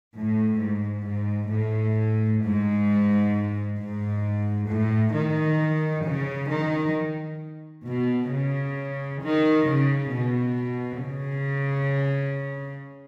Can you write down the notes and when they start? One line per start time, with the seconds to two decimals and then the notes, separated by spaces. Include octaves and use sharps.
0.14 A2
0.59 G#2
1.05 G#2
1.50 A2
2.42 G#2
3.78 G#2
4.69 A2
5.14 D#3
6.05 C#3
6.51 D#3
7.87 B2
8.34 C#3
9.25 D#3
9.70 C#3
10.15 B2
11.06 C#3